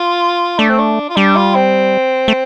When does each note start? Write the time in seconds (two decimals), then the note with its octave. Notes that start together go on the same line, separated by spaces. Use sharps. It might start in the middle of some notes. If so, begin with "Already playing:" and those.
Already playing: F4
0.59 A3 D4
0.69 C4
0.79 D4
1.09 F4
1.16 G3 D4
1.36 F4
1.55 C4
2.28 A3